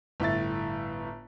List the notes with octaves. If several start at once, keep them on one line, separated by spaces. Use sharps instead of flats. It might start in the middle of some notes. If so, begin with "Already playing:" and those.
G1 A2 E5 A6